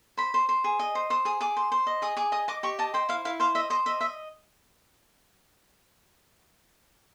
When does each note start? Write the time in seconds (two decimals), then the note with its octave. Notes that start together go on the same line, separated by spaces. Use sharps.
0.17 C5 B5
0.34 C5
0.49 C5
0.64 G#4
0.79 D#5
0.95 C5
1.10 C5 D#6
1.25 G#4 D#6
1.41 G#4 D6
1.57 C5
1.72 C5
1.87 D#5
2.02 G#4 D#6
2.17 G#4 D6
2.32 D#5 D#6
2.48 D#5 D6
2.63 G4 C#6
2.79 D#5 A5
2.94 C5 G5
3.09 E4 F5
3.25 E4 F5
3.40 C5 F5
3.55 D#5 E5
3.70 C5 D#5
3.86 D#5 E5
4.01 D#5 E5